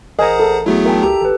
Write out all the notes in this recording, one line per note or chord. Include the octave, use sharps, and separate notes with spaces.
A1 G#4 A#4 C5 D#5 F#5 G#5 A#5
A4
F#3 A3 B3 E4 F#4 G#4
A#4 E5 G5 A5
D2 G4 A4 A#5
A1 A4 B4